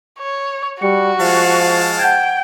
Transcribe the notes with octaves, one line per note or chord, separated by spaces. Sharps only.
C#5
G3 F#4 C#7
F3 G#3 F5 A5
F#5 G5 G6 G#6